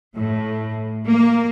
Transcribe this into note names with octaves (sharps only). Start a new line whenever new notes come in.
A2
A#3